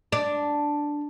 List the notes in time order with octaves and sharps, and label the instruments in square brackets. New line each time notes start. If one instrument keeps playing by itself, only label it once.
[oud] D4